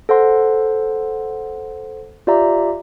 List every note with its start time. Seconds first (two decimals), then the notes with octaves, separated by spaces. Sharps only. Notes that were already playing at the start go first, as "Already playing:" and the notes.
0.09 A4 C5 F#5 C6
2.27 F4 G4 D5 E5 A#5